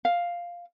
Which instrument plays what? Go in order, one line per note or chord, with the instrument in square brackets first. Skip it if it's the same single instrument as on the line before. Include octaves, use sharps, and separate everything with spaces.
[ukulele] F5